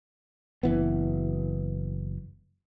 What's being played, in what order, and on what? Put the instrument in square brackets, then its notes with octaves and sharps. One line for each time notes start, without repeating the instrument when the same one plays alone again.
[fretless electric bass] F#1 E3 B3